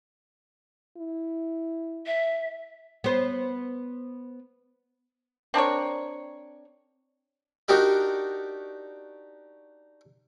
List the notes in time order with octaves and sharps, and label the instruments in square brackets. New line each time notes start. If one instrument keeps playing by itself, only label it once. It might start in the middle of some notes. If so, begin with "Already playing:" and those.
[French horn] E4
[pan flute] E5
[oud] B3 C5
[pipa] C4 D4 A#4 C#5
[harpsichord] D4 D#4 F#4 G4 A#4 D5